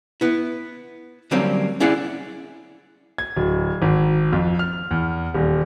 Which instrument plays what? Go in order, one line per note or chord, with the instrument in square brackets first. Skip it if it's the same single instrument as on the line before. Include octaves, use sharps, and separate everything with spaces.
[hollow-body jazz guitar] B3 E4
D3 F#3 G3 A#3 C4 C#4
C#4 E4 G#4 D5 F#5
[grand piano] G#6
D1
G#1
F2
F6
E2
D#1